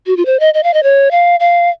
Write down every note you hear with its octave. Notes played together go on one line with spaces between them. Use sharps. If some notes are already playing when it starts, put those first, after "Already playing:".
F#4
F4
C5
D#5
D#5
F5
D#5
C#5
F5
F5